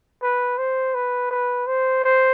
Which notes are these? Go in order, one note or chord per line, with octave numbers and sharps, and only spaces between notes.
B4
C5
B4
B4
C5
C5